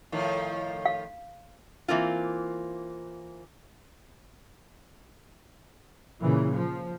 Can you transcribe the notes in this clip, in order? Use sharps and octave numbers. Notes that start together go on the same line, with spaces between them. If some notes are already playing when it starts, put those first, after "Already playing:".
A2 D#3 F3
F5
E3 A#3 C4 F4
A#2 C#3 E3
F3